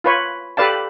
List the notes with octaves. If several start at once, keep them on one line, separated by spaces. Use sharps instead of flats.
F4 B4 C#5
G4 A4 B4 D5 F5 A5